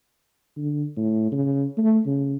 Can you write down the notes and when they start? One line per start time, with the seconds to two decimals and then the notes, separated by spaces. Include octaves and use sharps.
0.56 D3
0.96 A2
1.32 C#3
1.77 A3
2.06 C#3